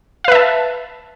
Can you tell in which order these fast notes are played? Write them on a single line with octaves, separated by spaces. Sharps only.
F5 B4 E5 A5